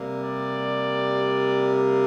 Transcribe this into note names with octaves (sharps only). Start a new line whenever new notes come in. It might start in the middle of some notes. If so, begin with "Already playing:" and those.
Already playing: C3 G3 A#3
D5
D5